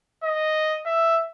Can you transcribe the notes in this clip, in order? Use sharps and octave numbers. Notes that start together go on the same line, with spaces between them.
D#5
E5